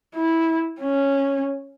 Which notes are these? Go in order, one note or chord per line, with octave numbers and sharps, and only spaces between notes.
E4
C#4